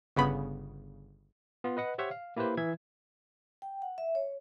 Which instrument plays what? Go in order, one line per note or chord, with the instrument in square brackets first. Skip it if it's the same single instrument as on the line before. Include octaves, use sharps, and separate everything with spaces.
[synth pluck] G1 C#3 B3 B5
[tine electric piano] B3 F4
B4 D#5 F#5
G4 C5 C#5 E5 F#5
F5
A#3 E4 G4 B4 C5
E3 E5 G#6
[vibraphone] G5
F#5
E5
C#5